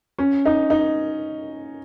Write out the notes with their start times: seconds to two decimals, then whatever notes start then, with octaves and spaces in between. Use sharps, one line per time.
0.18 C#4
0.46 D#4
0.70 D#4